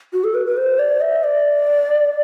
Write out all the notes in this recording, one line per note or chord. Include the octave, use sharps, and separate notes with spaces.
F#4
A4
B4
B4
C5
D5
E5
D5